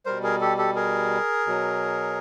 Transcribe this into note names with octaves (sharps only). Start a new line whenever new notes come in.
B2 G3 A#4 C5
G#4 A#4
G4 A4
G4 A4
G#4 A#4
B2 F#3